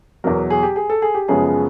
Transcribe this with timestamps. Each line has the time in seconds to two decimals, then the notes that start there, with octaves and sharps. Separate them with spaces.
0.24 E2 B2 F#3 A#4
0.50 G#4
0.63 G4
0.76 G#4
0.90 A4
1.02 G#4
1.15 G4
1.28 F#2 C#3 F3 G#3 B3 G#4
1.45 G#4